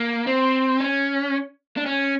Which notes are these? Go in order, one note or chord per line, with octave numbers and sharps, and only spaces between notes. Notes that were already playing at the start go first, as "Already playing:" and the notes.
Already playing: A#3
C4
C#4
D4
C#4